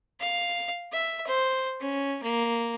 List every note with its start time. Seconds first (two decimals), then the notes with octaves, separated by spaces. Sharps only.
0.20 F5
0.93 E5
1.27 C5
1.80 C#4
2.23 A#3